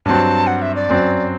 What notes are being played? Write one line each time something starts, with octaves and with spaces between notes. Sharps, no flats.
G2 F#3 C4 A5
F#5
E5
D5
F#2 F#3 C4